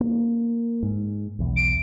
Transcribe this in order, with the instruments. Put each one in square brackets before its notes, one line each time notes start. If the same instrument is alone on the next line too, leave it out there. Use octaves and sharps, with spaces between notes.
[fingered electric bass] A#3
G#2
B1 E2
[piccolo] D7